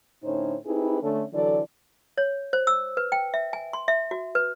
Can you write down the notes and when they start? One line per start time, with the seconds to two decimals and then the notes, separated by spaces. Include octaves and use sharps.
0.24 A2 D3 C#4 D#4 C5 C#5
0.66 C4 D#4 E4 G4 G#4 B4
1.02 D3 A3 C#4
1.33 D3 E3 F#3 A4 D5
2.18 C#5
2.53 C5
2.67 E6
2.97 B4
3.12 G5
3.34 E5
3.53 G#5
3.73 C6
3.88 E5
4.11 F#4
4.35 B4